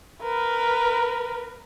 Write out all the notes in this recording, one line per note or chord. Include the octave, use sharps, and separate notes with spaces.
A#4 B4